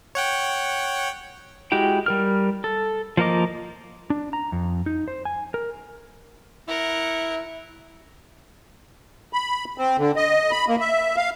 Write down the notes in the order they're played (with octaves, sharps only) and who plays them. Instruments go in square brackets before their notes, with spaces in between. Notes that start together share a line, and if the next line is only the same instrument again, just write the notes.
[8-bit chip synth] C#5 F#5 G5
[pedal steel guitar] G#3 E4 F#4 G4 G5
G3 A#4 F6
A4
F3 A#3 A#4 D#5 D6
[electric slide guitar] D4
A#5
F2
D#4
C5
G#5
A#4
[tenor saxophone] E4 [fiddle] A#4 F#5
[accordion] B5
C4
D3
D#5
B5
A#3
E5
F5